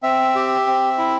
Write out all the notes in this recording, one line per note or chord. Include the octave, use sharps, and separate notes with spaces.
C4 E5
G4
C4
E4